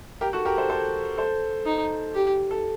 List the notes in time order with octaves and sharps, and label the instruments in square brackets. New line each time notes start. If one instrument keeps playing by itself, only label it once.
[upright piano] G4 A#4
F#4 A4
G4 A#4
A4 C5
A4 C5
A4 C5
[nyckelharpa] D#4
G4
[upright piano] A4